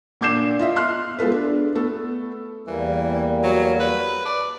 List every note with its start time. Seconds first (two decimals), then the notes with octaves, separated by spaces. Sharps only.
0.21 A#2 D4 D6 G6 C7 E7
0.59 F4 D#5 E5
0.76 C6 F6 F#6 C7
1.19 G#3 B3 F4 A4 B4
1.32 D4
1.75 A3 B3 A4
2.67 E2 E3 G3 A#3
3.44 F#3
3.80 B4
4.26 D5